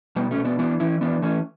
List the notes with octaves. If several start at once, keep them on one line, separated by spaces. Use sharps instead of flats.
B2 G3 B3
A3 C#4
B2
B3 D4
E3 B3 D4
E3 C#4 E4
E3 B3 D4
E3 A3 C#4